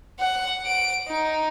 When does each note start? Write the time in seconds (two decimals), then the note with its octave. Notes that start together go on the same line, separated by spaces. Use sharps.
0.20 F#5
0.66 D7
1.08 D#4